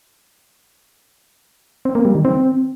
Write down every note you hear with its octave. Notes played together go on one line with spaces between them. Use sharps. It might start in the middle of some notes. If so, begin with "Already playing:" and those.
C4
A#3
G3
D#3
C4